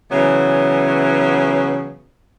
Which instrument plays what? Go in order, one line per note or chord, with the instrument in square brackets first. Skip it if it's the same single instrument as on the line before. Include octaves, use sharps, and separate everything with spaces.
[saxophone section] C#3 E3 F#3 B3